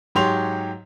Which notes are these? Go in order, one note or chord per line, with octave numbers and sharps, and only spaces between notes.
G#2 F#3 G4 C#5 C6 F7